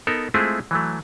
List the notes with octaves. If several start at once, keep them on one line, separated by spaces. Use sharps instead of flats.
B3 D#4 A4 A#4
G#3 A3 C4 E4 F4 G#4
E3 F#3 A3